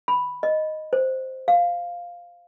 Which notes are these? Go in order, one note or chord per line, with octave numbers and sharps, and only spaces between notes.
B5
D#5
C5
F5